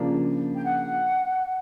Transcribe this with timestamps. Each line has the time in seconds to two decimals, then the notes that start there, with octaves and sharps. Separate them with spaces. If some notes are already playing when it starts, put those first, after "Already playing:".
Already playing: C#3 F3 A#3 D4
0.56 G5
0.65 F#5